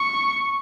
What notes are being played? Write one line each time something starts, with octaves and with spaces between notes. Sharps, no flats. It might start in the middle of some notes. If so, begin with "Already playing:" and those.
Already playing: C#6